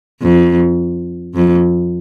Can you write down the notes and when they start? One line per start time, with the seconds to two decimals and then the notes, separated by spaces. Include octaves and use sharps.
0.22 F2
1.35 F2